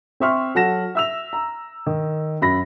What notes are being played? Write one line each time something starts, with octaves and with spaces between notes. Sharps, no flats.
C4 C5 E5 C6 C#6 F6
F#3 A4 F#5 A5 A#6 E7
E5 E6 F7
A#5
D#3
F#2 B5 A#6